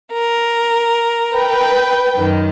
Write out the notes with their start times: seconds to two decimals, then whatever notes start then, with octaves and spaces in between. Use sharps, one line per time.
0.13 A#4
1.32 B4 G5
2.14 F#2 D#3